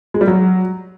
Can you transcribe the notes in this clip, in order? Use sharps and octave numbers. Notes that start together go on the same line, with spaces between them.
G#3
G3
F#3